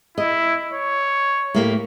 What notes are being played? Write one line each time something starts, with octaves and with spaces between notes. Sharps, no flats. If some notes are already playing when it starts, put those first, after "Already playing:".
E4 D#5
C#5
A2 A#3 G4